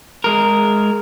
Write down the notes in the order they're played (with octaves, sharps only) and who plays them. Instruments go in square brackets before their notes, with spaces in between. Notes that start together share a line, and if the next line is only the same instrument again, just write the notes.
[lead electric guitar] G#3 A#4